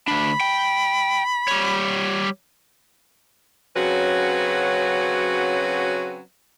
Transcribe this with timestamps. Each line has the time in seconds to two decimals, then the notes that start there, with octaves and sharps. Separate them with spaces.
0.08 D2 D4 B5
0.40 G5
1.48 G3 C#5
3.75 C#3 F#3 C4 C#4 F#4 B4